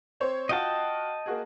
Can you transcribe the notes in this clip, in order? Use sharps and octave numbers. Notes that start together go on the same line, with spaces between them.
C4 C5 C#5
F4 F#4 D#5 F#5 G5 A5
A#3 F#4 G#4